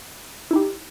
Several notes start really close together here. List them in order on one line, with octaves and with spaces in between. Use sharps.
E4 D#4 G4